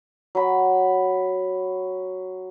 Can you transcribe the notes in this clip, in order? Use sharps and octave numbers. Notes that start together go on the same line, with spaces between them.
F#3 B5